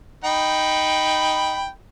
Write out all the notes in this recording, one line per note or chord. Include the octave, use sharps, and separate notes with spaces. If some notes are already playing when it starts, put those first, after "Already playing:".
D#4 G5 B5